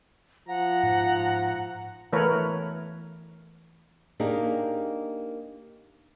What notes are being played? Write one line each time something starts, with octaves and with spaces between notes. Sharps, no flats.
F3 F#5 A#5
G#2
E3 A3 A#4 B4 C#5
A#3 D4 D#4 G4 G#4